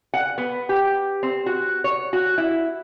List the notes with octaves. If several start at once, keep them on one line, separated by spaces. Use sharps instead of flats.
F#5
B3
G4
C4
F#4
C#5
F#4
E4